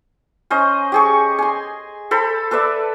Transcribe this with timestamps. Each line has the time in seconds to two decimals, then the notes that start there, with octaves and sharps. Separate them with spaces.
0.50 C#4 C5 D#5
0.92 G4 G#4 C#6
1.39 G#5 C6
2.11 A4 C5 B5
2.51 A4 B4 D5 E5